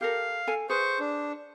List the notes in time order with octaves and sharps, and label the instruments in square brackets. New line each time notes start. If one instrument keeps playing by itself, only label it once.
[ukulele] G4 A4 A#4 [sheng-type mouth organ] F5
[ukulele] A4 G#5
[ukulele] G#4 B4 [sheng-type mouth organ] C5 C#6
[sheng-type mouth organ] D4